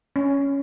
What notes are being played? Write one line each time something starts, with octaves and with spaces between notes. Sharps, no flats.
C#4